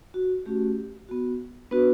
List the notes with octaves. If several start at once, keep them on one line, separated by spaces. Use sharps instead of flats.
F#4
A3 C#4 F#4 G4
B3 F#4
B3 D4 F#4 B4